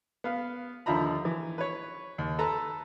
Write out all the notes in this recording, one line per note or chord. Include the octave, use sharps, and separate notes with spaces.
B3 F5
D#2 D3 F3 E5 A#5 B5
E3
B4 C#5
D#2
A4 B4 A5 A#5